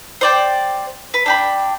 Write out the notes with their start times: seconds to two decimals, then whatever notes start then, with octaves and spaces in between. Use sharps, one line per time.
0.21 C5 D5 G5
1.14 B4
1.26 D4 G5 B5